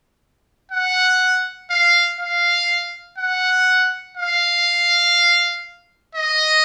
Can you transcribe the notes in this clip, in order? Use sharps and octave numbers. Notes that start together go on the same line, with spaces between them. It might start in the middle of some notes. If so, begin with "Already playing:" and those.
F#5
F5
F5
F#5
F5
D#5